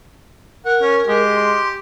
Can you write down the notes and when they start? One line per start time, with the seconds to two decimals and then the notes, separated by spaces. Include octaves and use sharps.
0.65 A#4 F#5
0.82 C#4
1.07 G#3 G4
1.37 C6